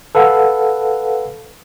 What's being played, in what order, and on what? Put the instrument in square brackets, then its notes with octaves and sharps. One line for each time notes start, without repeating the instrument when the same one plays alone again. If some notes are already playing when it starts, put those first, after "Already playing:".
[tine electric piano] A4 B4 F5 F#5